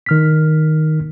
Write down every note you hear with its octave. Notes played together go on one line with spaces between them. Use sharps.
D#3 F6 B6